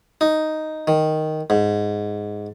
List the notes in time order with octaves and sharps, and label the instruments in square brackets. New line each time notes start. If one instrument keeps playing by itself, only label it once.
[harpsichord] D#4
D#3
G#2